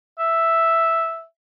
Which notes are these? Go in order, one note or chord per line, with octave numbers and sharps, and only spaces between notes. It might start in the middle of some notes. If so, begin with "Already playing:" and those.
E5